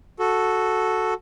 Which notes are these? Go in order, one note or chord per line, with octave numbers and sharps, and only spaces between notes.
F#4 A4